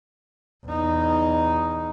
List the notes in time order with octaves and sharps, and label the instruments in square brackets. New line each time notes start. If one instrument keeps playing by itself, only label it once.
[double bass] E2 D#4